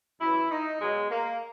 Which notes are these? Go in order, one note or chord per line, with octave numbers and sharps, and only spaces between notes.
F#2 E3 E4
D#4
B2 F#3 G#3
A#3